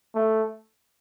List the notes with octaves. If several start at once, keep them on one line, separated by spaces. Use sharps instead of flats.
A3